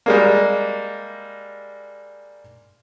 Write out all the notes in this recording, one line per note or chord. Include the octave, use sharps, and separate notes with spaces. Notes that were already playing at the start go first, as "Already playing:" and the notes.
G3 G#3 A#3